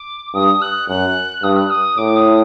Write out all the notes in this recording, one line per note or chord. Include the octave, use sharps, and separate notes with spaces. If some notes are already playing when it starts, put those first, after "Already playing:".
Already playing: D6
G2 D#6
F#6
F#2 F#6
G2 D#6
F#6
D#6
A2 D6
D#6